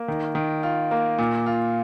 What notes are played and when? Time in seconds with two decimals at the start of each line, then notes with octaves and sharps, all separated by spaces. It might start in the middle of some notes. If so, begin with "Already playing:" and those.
Already playing: A#3
0.08 D#3
0.35 D#3
0.63 F4
0.91 A#3
1.18 A#2
1.46 F4